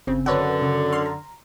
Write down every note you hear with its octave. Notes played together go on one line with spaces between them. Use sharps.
G1 C#3 C4
F#2 D3 B4 C#5 F#5
C#3
C6 F6
A#5